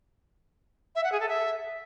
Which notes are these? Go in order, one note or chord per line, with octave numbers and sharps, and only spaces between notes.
E5
F#5
G#4
A4
E5